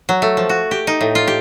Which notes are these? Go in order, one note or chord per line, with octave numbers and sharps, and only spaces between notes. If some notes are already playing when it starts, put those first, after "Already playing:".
F#3
A3
F3
F#4
G4
D#4
A2
F4
G4